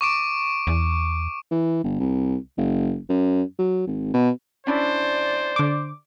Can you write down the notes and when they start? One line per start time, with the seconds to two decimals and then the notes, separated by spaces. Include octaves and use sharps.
0.01 C#6 D6 D7
0.67 E2
1.51 E3
1.84 G1
2.00 C2
2.58 F#1
3.09 F#2
3.59 F#3
3.87 G#1
4.14 B2
4.67 C#4 D4 E4 C5 D5
5.56 D3 D6